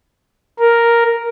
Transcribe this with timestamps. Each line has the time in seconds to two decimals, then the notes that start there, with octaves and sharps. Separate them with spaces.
0.60 A#4